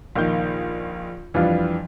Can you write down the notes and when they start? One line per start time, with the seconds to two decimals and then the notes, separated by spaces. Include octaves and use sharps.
0.16 A#1 D#3 A#3 G6
1.34 F2 E3 F3 G3 D4 F4